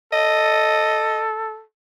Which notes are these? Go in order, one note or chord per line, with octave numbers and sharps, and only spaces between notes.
A4 D#5